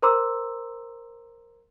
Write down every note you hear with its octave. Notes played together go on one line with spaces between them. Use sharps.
A#4 C5 A#5 C6 D6 E6